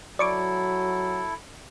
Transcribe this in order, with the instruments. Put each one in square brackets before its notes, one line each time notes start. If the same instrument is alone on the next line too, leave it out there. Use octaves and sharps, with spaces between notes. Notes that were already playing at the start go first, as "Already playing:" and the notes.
[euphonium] F#3 [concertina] E4 A4 [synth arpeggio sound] D5 C#6 D6